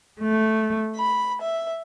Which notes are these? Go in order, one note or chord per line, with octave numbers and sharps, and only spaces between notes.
A3
B5
E5